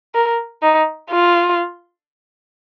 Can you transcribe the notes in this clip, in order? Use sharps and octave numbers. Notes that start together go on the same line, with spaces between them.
A#4
D#4
F4